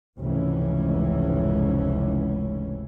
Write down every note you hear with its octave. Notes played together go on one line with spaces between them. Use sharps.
F1 C#2 G#2 E3 C#4